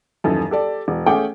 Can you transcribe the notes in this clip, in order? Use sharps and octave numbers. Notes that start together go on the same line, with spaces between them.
D#1 F#2 E3 D#4 A4
G4 A4 D5
E1
A3 C#4 G#4 F#5 G5 D6